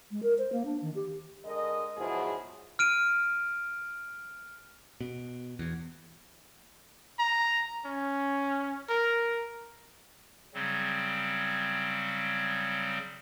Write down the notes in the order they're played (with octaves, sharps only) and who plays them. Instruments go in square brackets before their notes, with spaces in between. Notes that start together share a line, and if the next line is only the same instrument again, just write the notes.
[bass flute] G#3
A#4
C5
A#3
D4
D#3
G4
[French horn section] D3 G#3 A#4 D#5
G#2 B2 F3 F#3 E4 G#4
[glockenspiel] F6 D7 D#7
[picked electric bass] B2
E2
[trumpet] A#5
C#4
A#4
[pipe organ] C#3 F#3 G3 C4